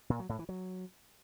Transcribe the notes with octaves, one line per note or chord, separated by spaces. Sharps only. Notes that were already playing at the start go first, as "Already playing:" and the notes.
A#2
F#3
A2
E3
F#3